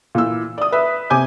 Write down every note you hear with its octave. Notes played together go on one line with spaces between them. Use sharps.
A#2 E3 E6
D5 D#6
B4 E5
C3 G#5 D6 G6